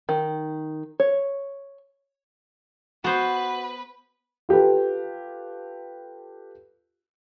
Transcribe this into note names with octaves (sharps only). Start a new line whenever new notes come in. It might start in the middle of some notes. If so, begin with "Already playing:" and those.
D#3
C#5
B3 F#4 B4 C5
F4 G4 A4 B4